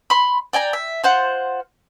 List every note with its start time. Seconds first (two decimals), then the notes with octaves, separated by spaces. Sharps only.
0.10 B5 C6
0.53 D5 G5 G#5 A#5
0.73 E5
1.04 F4 C5 F#5